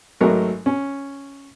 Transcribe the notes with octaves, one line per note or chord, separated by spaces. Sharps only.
G#1 F#3 A3 A#4
C#4